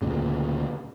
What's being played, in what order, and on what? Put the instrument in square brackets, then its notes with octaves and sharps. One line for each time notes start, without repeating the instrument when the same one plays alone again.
[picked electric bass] D2 A#2 C#3